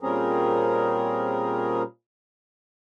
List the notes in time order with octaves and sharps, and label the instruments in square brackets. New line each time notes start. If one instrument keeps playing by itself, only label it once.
[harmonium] A#2 G3 C4 C#4 G#4 A#4